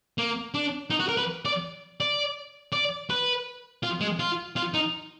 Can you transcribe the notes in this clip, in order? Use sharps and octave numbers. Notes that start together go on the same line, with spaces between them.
A#3
D4
D#4
F#4
A#4
B4
D5
D5
D5
B4
F4
G#3
F4
F4
D#4